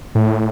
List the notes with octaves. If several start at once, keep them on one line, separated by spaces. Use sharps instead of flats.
A2